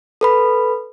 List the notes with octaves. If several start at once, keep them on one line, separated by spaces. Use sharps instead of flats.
A4 B4 B5